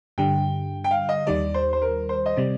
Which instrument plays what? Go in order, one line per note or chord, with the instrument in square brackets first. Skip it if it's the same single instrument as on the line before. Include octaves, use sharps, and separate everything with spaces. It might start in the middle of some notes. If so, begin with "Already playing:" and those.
[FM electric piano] G2 D3 G3 [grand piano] G5
[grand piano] G5
F5
D#5
[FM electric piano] D#2 D#3 G3 [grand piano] D5
[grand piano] C5
C5
A#4
C5
D#5
[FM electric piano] C3 G3 [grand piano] D5